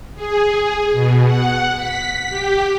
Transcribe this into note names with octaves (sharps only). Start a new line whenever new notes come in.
G#4
B2
F#5
B6
G4